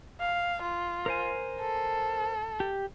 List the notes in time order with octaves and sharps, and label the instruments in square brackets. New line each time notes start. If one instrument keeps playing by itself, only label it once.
[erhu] F5
F4
[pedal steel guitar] A#4 C5 G#5
[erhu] A4
[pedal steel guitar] G4